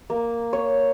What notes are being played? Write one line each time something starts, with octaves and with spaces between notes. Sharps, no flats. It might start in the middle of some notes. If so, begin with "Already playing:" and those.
A#3
C#5